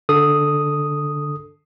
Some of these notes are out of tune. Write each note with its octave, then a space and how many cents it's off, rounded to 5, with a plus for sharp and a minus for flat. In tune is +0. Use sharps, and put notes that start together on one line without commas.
D3 +0 A4 +0 D#6 +0